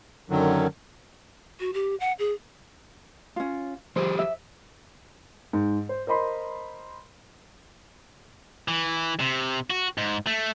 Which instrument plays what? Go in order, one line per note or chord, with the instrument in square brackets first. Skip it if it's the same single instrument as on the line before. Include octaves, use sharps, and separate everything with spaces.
[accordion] F#2 D3 D#3 F#3
[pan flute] F#4
G4
F#5
G#4
[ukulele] C#4 F4
[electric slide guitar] F3 G4 G#4 [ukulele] C5
[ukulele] E5
[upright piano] G#2
C5
A#4 C5 D#5 B5 C6
[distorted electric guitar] E3
C3
F#4
G#2
A3